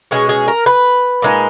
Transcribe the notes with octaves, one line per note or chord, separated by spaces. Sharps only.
B2 G#3 C#4 G#4
G#4
A#4
B4
A#2 G#3 D#4